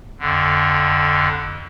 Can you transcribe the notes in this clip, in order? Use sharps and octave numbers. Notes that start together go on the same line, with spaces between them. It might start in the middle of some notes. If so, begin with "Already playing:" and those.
F2 D3